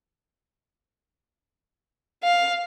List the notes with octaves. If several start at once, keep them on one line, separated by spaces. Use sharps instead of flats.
F5